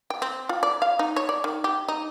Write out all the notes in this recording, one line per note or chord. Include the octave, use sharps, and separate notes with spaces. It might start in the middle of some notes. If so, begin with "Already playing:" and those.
G5
C4
F4
D5
F5
D#4
C#5
D5
D#3
G4
D#4